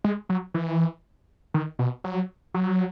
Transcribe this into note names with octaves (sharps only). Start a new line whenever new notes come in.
G#3
F#3
E3
D#3
B2
F#3
F#3